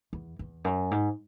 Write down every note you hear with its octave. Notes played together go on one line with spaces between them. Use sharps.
E2
E2
F#2
G#2